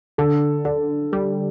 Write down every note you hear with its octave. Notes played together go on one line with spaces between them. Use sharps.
D3 A4
D3 A4
G3 A4